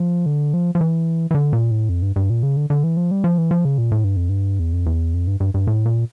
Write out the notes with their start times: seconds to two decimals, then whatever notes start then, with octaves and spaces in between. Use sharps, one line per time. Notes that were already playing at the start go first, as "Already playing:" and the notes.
Already playing: F3
0.26 D3
0.54 F3
0.75 F3
0.81 E3
1.31 E3
1.35 D3
1.53 A#2
1.71 A2
1.89 F2
2.02 G2
2.16 G2
2.30 A#2
2.43 C#3
2.56 D3
2.70 D3
2.84 E3
2.97 F3
3.11 G3
3.24 F3
3.38 E3
3.51 F3
3.65 C#3
3.78 A#2
3.92 A2
4.04 G2
4.16 F2
4.29 G2
4.59 E2
4.73 F2
4.86 E2
5.14 F2
5.27 G2
5.40 G2
5.54 G2
5.67 A2
5.86 A#2